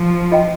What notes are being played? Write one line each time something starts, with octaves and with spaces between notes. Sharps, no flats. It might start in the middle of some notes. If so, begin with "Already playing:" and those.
Already playing: F3
F4 D#5 G5